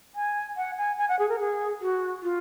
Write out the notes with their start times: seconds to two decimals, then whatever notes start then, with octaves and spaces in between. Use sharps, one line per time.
0.15 G#5
0.57 F#5
0.78 G#5
0.98 G#5
1.09 F#5
1.19 G#4
1.29 A#4
1.40 G#4
1.82 F#4
2.23 F4